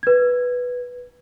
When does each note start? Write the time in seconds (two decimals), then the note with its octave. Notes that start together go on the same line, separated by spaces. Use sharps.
0.03 B4 G#6